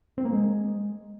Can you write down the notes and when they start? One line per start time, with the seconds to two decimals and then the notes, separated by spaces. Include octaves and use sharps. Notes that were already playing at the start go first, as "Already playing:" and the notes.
0.18 C4
0.25 A#3
0.32 G#3